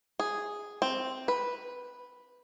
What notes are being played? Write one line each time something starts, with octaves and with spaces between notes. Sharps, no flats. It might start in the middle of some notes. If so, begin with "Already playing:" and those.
G#4
C4
B4